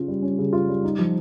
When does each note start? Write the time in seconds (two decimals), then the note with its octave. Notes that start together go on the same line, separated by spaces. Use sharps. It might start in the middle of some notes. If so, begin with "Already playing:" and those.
Already playing: C#3 C#4 F4
0.08 G3
0.22 C#4
0.38 C#3
0.53 F4
0.69 G3
0.84 D#4
0.99 F3